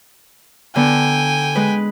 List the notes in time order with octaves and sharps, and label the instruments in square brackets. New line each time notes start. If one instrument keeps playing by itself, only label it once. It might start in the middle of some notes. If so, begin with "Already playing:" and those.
[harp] D3 B3 [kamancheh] G5 G#5
[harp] G#3 B4